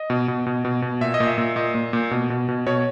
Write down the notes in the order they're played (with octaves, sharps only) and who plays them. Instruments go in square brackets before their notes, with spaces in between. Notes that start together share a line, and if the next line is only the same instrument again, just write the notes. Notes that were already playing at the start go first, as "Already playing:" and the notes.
Already playing: [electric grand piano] D#5
B2
B2
B2
B2
B2
A#2 E5
D#5
A#2
E5
A#2
A#2 D#5
A#2
A#2
B2
B2
B2
B2 C#5